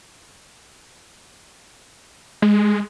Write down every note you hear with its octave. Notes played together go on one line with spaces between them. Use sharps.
G#3